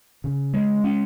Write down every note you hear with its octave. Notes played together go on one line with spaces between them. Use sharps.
C#3
G#3
C#4